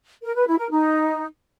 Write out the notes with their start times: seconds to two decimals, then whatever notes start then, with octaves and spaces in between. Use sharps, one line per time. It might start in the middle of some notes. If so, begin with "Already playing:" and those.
0.23 A#4
0.35 B4
0.47 E4
0.58 A#4
0.70 D#4